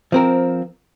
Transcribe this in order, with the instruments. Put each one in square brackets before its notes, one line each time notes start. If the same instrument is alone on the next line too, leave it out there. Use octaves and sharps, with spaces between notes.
[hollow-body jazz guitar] F3 C4 A#4